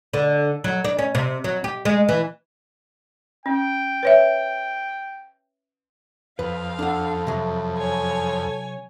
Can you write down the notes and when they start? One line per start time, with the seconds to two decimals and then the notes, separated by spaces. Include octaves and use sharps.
0.13 D3
0.64 F#3
0.84 D4
0.99 C#4
1.15 C3
1.44 F#3
1.64 G4
1.85 G#3
2.09 E3
3.46 C#4 G5
4.03 B4 C#5 E5
6.39 F2 B4 F5
6.79 D4 A4 F#5
7.27 C3 F#3
7.77 C#5 G#5